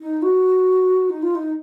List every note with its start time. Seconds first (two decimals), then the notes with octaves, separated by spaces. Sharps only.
0.01 D#4
0.22 F#4
1.10 D#4
1.23 F4
1.35 D#4